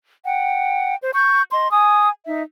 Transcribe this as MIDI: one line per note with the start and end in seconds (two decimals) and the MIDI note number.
0.25 0.95 78
0.25 0.95 79
1.03 1.11 72
1.14 1.42 85
1.14 1.42 91
1.52 1.71 75
1.52 1.71 84
1.71 2.08 80
1.71 2.08 87
2.27 2.42 63
2.27 2.42 76